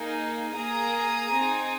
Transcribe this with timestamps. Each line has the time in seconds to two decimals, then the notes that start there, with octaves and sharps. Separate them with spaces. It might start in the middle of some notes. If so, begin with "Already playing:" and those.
Already playing: A#3 D#4 G#4
0.54 A#3 G#4 A#5 D#6
1.32 C4 D#4 G#4